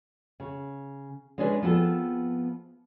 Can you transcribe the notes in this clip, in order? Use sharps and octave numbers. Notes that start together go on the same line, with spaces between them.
C#3
G#3 C#4 D4 G#4 A4 B4
F3 B3 C4 G#4 A4